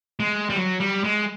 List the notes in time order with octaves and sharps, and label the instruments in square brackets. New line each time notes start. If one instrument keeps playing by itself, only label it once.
[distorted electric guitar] G#3
G3
F#3
G3
G#3